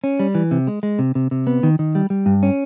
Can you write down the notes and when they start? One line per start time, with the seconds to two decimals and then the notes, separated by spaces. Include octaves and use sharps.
0.04 C#4
0.19 G3
0.35 E3
0.51 C3
0.67 G#3
0.83 G#3
0.99 C3
1.15 C3
1.31 C3
1.47 B3
1.63 D#3
1.79 D#3
1.95 G3
2.10 G3
2.26 G2
2.43 C#4